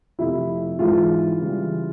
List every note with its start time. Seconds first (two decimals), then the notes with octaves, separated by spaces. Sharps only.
0.19 F2 C3 F3 A3 E4
0.79 G#2 E3 G#3 F4
1.40 C#3 E3 G3